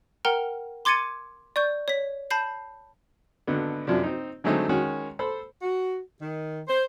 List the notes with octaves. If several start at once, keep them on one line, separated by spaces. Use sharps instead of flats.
A#4 F#5 G5 A#5 F6
C6 D6 G#6 A6 C#7 D#7
D5 C#6 G6
C#5 B6
A5 B5 G6 C7
G#1 D3 B3
F#2 C3 F3 D4
C4 D#4
D3 F#3 G#3 A3 C4 D#4
D#3 G#3 C#4 F#4 C#5
A4 C5 B5
F#4
D#3
C5